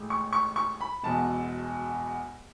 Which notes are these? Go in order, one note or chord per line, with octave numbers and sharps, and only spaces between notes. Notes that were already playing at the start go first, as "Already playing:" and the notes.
Already playing: A1 A2 G#3
C#6
C#6
C#6
B5
E1 E2 B2 A5